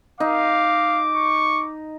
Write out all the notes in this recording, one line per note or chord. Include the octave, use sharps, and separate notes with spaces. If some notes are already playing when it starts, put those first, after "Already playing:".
D#4 F5 D6
C#6